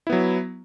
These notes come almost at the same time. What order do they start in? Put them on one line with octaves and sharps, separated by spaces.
E4 B3 F#3